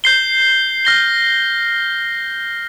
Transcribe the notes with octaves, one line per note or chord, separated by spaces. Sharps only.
G6 C7 G7
F6 A#6 G7